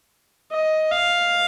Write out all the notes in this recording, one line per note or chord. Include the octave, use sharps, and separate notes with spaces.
D#5
F5